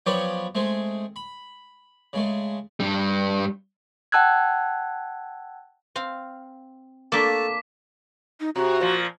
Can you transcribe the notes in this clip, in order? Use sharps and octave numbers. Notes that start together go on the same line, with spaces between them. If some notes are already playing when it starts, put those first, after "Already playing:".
F3 F#3 B3 G4 C#5 D5
G#3 A3 C4 G#4
B5
C#3 G#3 A3
G2 G3
F#5 G5 A5 E6 F#6 G#6
C4 F5
A3 A#3 D4 D6 B6
D#4
C3 F#4
A#2 F3